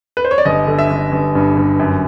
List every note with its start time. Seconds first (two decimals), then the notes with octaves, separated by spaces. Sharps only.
0.17 B4
0.25 C5
0.31 C#5
0.38 D5
0.45 G1 D#5
0.67 D3
0.79 E5
0.90 G1
1.12 G1
1.35 G2
1.57 G1
1.79 F#2